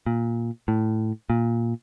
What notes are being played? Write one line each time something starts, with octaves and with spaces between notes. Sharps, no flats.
A#2
A2
A#2